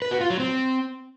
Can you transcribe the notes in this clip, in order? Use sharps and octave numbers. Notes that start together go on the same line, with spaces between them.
B4
F#4
F4
F#3
C4